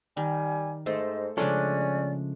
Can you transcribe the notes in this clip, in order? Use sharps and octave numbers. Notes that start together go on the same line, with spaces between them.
D#3 G3 G#5
G#2 A3 A4 C5 D#5
C#3 F3 G#3 A3 C#4 D4 A4 D5